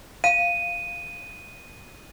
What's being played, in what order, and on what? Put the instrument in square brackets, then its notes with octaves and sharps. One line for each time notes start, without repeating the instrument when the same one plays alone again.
[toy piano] F5 [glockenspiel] D#7